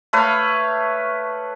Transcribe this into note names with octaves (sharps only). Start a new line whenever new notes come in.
A3 B4 C#5 F5